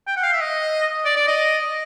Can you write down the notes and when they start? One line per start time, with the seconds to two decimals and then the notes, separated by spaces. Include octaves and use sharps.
0.07 G5
0.16 F#5
0.24 F5
0.33 E5
0.41 D#5
1.05 D5
1.16 D5
1.27 D#5